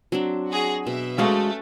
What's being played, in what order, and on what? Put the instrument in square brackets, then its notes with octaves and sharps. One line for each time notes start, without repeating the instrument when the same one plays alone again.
[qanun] F#3 C4 D4
[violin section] F#4 G#4
[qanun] B2 [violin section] E5
[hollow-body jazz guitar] G#3 F#4 F5 [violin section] A3 [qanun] C#4 F#5